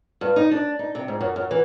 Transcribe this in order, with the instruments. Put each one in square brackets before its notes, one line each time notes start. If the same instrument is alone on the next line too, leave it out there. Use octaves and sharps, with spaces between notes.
[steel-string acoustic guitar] G2
D#4
D4
D#4
C3
G#2
F#2
F#2
E3